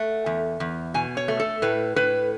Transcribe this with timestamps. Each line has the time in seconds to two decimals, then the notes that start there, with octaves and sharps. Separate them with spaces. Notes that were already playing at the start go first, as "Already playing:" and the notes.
Already playing: A3 F#5
0.26 E2
0.60 E2
0.94 B2 G#5
1.17 C#5
1.28 A3
1.40 A4
1.62 A2 B4
1.96 A2 B4